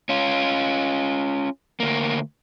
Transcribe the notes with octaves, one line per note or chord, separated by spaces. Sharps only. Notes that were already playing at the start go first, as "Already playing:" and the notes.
C#4 F4
D2 A#3